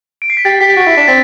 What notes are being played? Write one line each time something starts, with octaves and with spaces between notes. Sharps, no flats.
D7
C7
B6
G4 A6
G4 B6
F#4
E4
D4
C4 A6